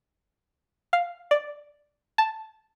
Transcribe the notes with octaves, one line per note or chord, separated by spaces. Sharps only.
F5
D5
A5